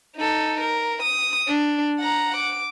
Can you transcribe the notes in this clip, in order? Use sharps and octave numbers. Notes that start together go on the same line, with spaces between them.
D#4 A4
A#4
D#6
D4
F#5 A#5
D6